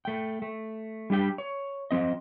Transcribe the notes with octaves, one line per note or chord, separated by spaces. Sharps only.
A3 G5
A3
G3 D4 G4 G5
C#5
F3 C4 D#5